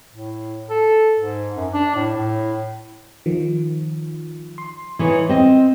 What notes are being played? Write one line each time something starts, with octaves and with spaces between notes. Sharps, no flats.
A2
A4
G#2
F#2
D4
A2
A2
D#3 F3
C6
E3 D#4 C#5
C4 D#5